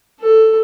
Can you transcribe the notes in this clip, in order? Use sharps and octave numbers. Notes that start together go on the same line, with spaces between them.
A4